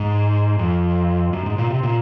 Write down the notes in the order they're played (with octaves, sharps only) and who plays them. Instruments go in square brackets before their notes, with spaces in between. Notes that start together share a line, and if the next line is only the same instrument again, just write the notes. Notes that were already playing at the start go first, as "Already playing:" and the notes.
Already playing: [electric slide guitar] G#2
F2
F#2
G#2
A#2
C3
A#2